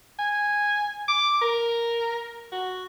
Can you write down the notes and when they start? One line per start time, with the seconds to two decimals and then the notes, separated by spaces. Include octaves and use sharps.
0.19 G#5
1.08 D6
1.42 A#4
2.52 F#4